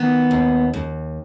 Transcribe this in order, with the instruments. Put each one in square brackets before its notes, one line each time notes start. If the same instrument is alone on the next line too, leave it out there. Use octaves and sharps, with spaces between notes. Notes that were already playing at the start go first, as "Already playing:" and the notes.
Already playing: [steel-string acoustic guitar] D#3 B3
D#2
D#2